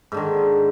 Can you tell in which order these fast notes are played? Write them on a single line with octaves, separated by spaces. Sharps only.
G#2 D3 D#3